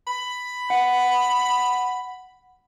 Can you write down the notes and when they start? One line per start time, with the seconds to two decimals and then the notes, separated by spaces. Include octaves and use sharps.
0.07 B5
0.70 F#5